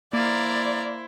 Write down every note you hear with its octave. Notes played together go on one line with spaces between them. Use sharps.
A#3 E4 C5 D5 F5 A#5